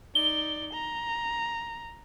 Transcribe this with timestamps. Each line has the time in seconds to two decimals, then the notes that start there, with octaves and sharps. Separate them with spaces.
0.15 D#4 D5 G7
0.73 A#5